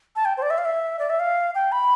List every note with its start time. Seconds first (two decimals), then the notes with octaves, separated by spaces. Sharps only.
0.16 A5
0.25 G5
0.37 C5
0.42 D5
0.50 E5
0.58 F5
0.65 E5
0.99 D5
1.10 E5
1.20 F5
1.55 G5
1.72 B5